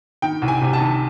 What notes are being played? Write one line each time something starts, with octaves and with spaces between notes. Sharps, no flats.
D#3 G5
C2
G#5
C3
A5
D#3